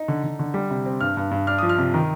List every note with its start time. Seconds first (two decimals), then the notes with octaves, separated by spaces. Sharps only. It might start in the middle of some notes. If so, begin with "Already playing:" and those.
Already playing: D#4
0.08 D3
0.23 D3
0.39 D3
0.54 G3
0.71 C3
0.86 C4
1.01 G2 F6
1.17 G2
1.31 G2
1.47 D4 F6
1.58 F3 D#6
1.69 F6
1.78 C3
1.94 D#3